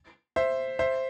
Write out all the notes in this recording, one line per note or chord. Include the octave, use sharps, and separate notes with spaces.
C5 E5
C5 E5